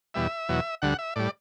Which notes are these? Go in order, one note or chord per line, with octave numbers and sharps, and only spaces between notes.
E2 B2 G3 E5
E2 B2 F#3
D2 D3 G3 F#5
E5
A2 G3 D5